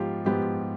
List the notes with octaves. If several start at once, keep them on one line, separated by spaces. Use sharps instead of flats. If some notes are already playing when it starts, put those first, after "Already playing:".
Already playing: G#2 F3 B3 F4 G4
G#2 F3 B3 G4